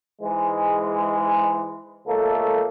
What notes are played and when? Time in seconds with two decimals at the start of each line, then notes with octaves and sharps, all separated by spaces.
0.22 G#2 E3 G#3
2.07 C#2 A3 A#3 A4